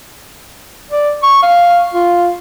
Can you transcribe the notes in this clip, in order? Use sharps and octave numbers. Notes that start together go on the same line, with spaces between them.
D5
C#6
F5
F4